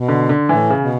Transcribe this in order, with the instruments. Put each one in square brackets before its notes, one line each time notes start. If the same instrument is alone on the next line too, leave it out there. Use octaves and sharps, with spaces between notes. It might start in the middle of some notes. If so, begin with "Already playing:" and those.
Already playing: [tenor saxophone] B2
[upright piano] D3
D3
[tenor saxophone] A2 [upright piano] E3
[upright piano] C#3
[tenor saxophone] B2